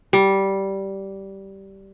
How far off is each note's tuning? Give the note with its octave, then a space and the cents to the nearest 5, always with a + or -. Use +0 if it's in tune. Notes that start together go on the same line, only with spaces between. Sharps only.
G3 -10